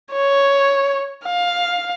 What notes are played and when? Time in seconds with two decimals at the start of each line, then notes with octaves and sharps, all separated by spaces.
0.12 C#5
1.26 F5